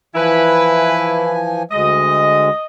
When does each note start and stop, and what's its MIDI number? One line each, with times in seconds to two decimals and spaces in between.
0.15 1.63 52
0.15 1.63 53
0.15 1.37 64
0.15 1.37 71
0.15 1.63 80
1.71 2.50 38
1.71 2.50 56
1.71 2.65 75